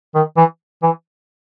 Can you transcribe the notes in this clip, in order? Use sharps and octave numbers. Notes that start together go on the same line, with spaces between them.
D#3
E3
E3